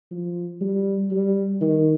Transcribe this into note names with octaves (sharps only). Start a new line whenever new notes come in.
F3
G3
G3
D#3